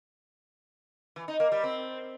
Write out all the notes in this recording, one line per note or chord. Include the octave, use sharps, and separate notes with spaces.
E3
D#4
A#3
G3
C4